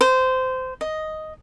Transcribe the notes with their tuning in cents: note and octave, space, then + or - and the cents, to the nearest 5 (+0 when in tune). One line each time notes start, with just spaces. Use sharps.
C5 -20
D#5 +5